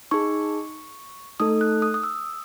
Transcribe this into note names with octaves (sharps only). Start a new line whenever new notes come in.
D#4 G#4 C#6
A3 D#4 A4 D#6
F#6
D#6
D#6
E6